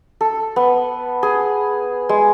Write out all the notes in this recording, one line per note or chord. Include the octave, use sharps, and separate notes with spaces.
A4
B3
G#4
G#3